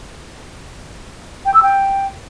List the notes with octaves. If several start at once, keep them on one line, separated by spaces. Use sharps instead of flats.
G5
E6
G5